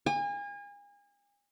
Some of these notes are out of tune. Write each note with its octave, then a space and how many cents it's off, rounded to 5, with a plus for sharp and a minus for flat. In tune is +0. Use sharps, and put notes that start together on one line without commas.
G#5 -35